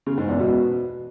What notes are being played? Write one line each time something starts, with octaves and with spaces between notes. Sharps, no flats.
C#3
G#2
E2
B2